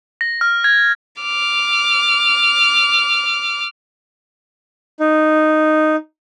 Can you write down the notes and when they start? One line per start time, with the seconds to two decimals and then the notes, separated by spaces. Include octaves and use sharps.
0.21 A#6
0.41 F6
0.64 G#6
1.22 D6 F6
5.00 D#4